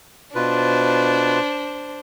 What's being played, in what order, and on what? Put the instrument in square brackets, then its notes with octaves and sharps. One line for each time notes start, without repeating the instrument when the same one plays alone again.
[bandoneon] B2 F4 B4 [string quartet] D4 C5